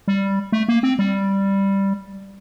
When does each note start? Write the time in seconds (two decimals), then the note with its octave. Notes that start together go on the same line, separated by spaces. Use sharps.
0.08 G3
0.52 A3
0.68 A#3
0.83 C4
0.99 G3